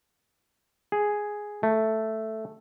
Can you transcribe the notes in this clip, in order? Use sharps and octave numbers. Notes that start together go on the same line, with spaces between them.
G#4
A3